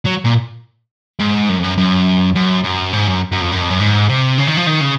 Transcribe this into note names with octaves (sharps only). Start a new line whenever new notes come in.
F#3
A#2
G#2
F#2
F2
F#2
F#2
F#2
F#2
G#2
F#2
F#2
F2
F#2
F2
F#2
G#2
C3
C#3
D#3
F3
D#3
C#3